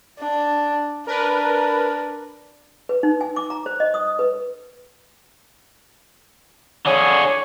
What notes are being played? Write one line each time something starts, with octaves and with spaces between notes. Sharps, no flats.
D4
D4 A#4 B4
B4
D#4
G#5
D6
A#5
C5
D#5
D#6
B4
D3 G#4 C#5